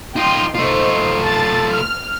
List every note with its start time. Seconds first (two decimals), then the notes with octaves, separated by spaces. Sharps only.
0.16 D#4 F4 G5 C6
0.55 A3 D#4 F4 C5
1.23 A5 A6
1.71 F6